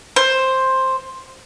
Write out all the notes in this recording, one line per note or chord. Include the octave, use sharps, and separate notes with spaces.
C5